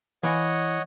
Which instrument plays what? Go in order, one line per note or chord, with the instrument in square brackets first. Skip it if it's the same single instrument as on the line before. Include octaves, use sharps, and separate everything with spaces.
[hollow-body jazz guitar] E3 F5 G#5 [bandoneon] C#5 D#5 F#5